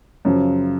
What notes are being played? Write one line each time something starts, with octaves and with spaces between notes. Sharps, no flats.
F#2 C#3 F3